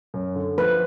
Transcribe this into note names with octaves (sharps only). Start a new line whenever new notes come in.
F#2
D3
F3 B4